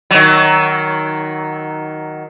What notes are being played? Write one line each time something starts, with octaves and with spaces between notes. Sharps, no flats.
D#3 F#3